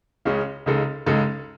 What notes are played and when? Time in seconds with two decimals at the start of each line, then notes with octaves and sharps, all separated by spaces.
0.25 C#2 C#3 G#3 C#4
0.66 C#2 C#3 G#3 D#4 A4
1.06 C#2 C#3 G#3 D#4 A4